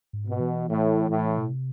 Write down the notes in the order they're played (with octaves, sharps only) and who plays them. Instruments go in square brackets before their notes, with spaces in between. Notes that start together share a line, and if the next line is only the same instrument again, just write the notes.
[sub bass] G#2
[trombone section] B2
[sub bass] E3
[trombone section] A2
A2
[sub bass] B2
C3